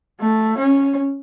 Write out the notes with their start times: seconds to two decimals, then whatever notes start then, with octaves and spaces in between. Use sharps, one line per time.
0.21 A3
0.58 C#4